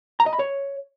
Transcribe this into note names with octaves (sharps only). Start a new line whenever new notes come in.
A#5
D#5
B5
C#5